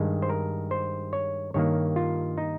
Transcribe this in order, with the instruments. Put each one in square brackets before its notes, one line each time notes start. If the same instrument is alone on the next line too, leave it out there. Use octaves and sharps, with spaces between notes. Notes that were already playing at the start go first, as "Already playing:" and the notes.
Already playing: [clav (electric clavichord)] G2 D#3 G#3
C5
A#4
C5
C#5
G2 D#3 A#3 C#5
F4
D#4